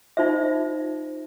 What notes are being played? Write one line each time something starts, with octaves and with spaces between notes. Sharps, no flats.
D#4 F4 C5 E5